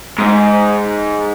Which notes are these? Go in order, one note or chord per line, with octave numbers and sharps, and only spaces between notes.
G#2